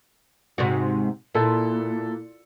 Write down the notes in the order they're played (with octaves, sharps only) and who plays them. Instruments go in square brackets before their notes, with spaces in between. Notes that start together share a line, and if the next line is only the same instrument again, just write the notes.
[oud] G#2 C3 F#4
[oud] A#2 [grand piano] E4 A4